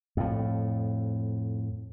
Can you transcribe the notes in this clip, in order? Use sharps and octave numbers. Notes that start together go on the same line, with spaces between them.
F2 A2